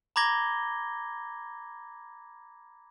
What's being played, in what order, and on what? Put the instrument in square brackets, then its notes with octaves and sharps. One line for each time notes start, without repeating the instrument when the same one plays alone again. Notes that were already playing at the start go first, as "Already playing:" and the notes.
[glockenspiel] A#5 B5 D6 G#6 A#6 G7